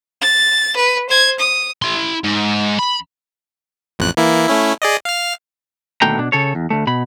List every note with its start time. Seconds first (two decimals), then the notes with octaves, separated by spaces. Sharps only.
0.21 A6
0.76 B4
1.09 C5 G#6
1.39 D#6
1.82 E4 C6
2.24 G#2
2.79 B5
3.99 A1 F2 F#6
4.17 E3 A#3 E4
4.47 A3 C#4 E4
4.82 G#4 D5 D#5
5.05 F5 F6
6.02 D#2 B2 D3 A3 G5 A#5
6.19 B2 D4
6.32 C#3 A4 C#5
6.55 E2
6.70 D2 A3
6.87 B2 B5